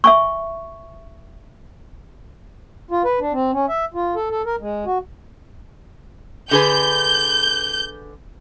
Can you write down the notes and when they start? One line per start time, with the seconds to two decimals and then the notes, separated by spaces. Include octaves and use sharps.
0.04 E5 G#5 C#6
2.91 F4
3.05 B4
3.20 D4
3.33 C4
3.53 C#4
3.69 E5
3.94 F4
4.15 A4
4.30 A4
4.46 A#4
4.60 G#3
4.85 F#4
6.51 D3 G#4 B4 G6